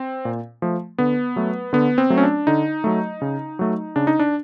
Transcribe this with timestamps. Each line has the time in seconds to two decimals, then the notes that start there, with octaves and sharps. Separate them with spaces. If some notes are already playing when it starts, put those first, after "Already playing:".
Already playing: C4
0.25 A#2
0.62 F3 A3
0.98 D3 B3
1.36 F#3 A3
1.73 D3 B3
1.98 C4
2.10 F#3 A3
2.18 C#4
2.23 D4
2.47 D3 D#4
2.84 F#3 A3
3.22 C#3
3.59 F#3 A3
3.96 C#3 D4
4.07 D#4
4.19 D4